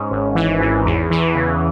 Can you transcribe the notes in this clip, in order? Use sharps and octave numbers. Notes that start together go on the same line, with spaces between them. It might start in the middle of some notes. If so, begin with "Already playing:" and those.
Already playing: G#2 C#4
G#1
E3
G#2
E2
E3
C#3